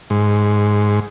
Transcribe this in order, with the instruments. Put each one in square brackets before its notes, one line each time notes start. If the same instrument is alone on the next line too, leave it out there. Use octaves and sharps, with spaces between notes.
[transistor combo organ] G#2